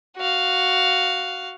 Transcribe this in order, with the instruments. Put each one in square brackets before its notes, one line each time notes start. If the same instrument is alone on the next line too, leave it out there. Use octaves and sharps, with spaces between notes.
[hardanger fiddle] F#4 F5